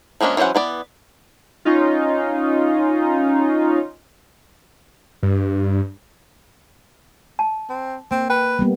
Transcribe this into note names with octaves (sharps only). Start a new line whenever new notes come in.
F3 G#3 A#3 C#4 D4
E3 F#3 C#4 C5 F#5
E3 B3 D5
C#4 D#4 F4
G2
A5
C4
A#3 C4
B4 G5
G3 A#3 B3